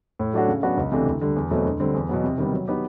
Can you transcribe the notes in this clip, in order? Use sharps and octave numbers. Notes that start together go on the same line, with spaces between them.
A2
F#3 A3 D4 F#4
C#3
F#3 B3 D4 F#4
C#2
C3 E3 A3 D4
D2
D3 G3
E2
B2 F#3 A3 C4
D2
D3 G3 C4
E2
B2 F#3 B3
C3
D#3 G3 B3
F#3
B3 D#4 G4